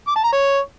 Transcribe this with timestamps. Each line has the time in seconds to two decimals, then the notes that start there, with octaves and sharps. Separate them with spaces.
0.08 D6
0.16 A5
0.24 A#5
0.32 C#5